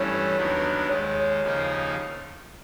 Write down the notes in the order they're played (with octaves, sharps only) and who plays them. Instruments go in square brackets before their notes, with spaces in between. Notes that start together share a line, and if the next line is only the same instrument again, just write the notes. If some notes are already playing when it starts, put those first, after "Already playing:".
Already playing: [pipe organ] G2 E3 A3 C#4 [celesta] C#5
[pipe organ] D#2 D#3 F#3 B3 D4
[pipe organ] D#2 D#3 G#3 [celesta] C#5
[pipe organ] D#2 C#3 F3 A#3 D#4